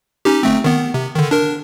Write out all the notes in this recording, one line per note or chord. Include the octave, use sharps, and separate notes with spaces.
C#4 D#4 G4
G1 A3 C4
D#3 B3
C3
D3 D#3
D4 A#4